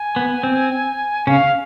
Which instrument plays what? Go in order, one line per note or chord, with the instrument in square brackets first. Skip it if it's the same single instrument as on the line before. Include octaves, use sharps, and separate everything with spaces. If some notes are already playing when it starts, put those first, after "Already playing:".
Already playing: [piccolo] G#5
[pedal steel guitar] B3
C4
[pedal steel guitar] C#3 C#4 [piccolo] F5